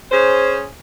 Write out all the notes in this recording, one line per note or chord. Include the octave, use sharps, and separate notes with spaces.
C#4 G#4 C5